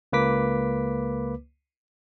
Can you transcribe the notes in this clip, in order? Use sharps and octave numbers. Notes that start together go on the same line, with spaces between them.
C#2 A#3 B4 D6 B6